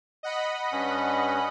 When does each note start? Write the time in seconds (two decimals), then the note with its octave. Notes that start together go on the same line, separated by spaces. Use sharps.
0.23 D#5 F#5 B5
0.72 G2 C#4